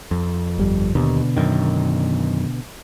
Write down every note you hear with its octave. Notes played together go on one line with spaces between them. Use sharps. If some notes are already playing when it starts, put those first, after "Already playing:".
F2
G1 G3
D#2 B2 D3
F#2 D#3